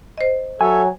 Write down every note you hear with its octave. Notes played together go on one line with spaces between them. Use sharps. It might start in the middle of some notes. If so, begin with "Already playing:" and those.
C5 D#5
F#3 A4 C#5 E5 G#5